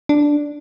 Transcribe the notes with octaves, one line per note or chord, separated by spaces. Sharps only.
D4